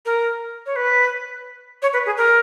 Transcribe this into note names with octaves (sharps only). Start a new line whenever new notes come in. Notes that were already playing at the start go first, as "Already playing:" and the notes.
A#4
C#5
B4
C#5
B4
G#4
A#4